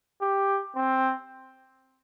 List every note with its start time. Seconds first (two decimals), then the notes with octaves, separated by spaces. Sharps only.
0.22 G4
0.76 C4